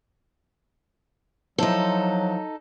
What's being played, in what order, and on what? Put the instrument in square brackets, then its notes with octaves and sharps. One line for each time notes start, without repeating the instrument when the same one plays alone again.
[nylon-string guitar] F3 E4 C5 [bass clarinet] F#3 [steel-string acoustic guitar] D#4 A4